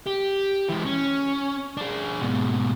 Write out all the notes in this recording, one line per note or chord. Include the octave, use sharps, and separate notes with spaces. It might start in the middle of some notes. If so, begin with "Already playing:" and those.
G4
E3 G#3
C#4
D4 G#4
G#2 B2